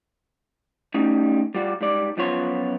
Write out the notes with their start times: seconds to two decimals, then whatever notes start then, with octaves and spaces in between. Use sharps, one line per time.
0.94 G3 A3 C#4 D#4
1.54 G3 F4 F#4 D5
1.81 G#2 G3 D5
2.17 F#2 F3 B3 F4 C#5 C6